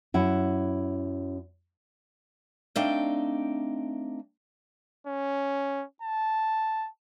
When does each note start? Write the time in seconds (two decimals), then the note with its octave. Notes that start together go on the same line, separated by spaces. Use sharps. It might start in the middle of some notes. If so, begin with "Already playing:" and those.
0.14 F#2 E4 F#5
2.76 A3 C4 D4 D#4 F5 G5
5.07 C#4
6.02 A5